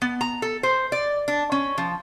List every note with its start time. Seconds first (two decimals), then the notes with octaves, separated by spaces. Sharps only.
0.02 B3
0.21 A#5
0.42 A4
0.63 C5
0.92 D5
1.28 D4
1.52 C#4
1.78 F3